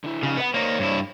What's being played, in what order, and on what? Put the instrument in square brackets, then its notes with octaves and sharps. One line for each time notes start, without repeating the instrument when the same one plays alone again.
[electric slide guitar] D3 E4
[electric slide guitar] F2 D#4 F4 [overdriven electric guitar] C#3
[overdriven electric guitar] B3 [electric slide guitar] B4 D#5 F#5
[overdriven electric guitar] A#3 D#4 [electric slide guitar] C5 C#5
[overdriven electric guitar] G2 E4